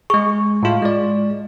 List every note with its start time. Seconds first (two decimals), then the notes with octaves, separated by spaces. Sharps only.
0.10 G#3 G#4 C#6
0.63 A2 F4
0.82 G#3 D5